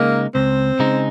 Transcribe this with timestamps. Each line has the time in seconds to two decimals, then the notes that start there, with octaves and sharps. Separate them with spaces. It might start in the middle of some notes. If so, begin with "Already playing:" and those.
Already playing: C#3 G#3 A#3 D#4
0.35 C#2 C4
0.79 C#3 G#3 D#4